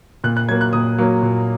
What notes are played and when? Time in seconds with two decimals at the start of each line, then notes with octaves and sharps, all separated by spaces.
0.24 A#2 F#6
0.37 F#6
0.49 F#3 A#3 G#6
0.61 F#6
0.73 A#2 D#6
0.98 F#3 A#3
1.22 A#2